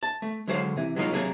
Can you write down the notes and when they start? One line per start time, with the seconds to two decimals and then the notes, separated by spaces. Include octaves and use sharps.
0.03 A5
0.22 A3
0.48 D3 F#3 G#3 C5 F5
0.76 C3 E3
0.96 F#3 G#3 A#3 D#4 F4 C#5
1.12 C3 F#3 A#3 D4 G#4 A#4